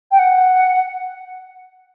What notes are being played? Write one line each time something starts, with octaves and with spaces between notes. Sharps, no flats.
G5
F#5